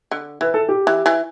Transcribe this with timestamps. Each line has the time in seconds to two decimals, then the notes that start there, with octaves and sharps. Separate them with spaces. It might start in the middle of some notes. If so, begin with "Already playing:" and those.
0.11 D3
0.41 E3 B4
0.54 A4
0.69 G4
0.87 E3
1.06 E3